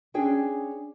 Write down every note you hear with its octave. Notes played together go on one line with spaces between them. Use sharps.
C#4 D4 G#4 G5